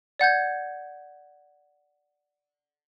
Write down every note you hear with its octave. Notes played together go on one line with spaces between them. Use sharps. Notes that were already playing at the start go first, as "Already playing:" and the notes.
D5 F#5 G6 G#6